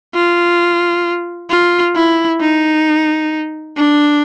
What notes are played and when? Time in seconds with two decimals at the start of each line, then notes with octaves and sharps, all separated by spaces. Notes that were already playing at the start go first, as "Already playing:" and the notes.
0.15 F4
1.50 F4
1.96 E4
2.41 D#4
3.78 D4